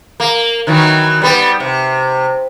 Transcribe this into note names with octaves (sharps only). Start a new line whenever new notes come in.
A#3
D#3 E3 F#3
G3 B3
C3